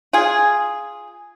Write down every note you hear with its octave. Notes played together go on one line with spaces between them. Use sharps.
F4 G#4